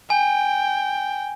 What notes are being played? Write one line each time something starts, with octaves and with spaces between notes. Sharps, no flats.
G5 G#5